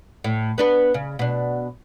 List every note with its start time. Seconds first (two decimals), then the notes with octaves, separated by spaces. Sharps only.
0.24 A2
0.58 B3 D4 B4
0.94 C#3
1.19 B2 D4